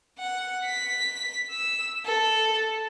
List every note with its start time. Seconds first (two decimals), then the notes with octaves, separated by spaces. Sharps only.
0.18 F#5
0.65 B6
1.51 E6
2.05 A4